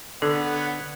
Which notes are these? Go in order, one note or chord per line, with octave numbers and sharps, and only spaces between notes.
D3 B3 A4 C#5 F#5